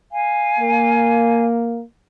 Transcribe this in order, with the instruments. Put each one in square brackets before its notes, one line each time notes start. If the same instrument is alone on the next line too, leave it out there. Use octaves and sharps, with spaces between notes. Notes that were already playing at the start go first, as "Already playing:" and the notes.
[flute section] F5 G#5
[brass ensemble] A#3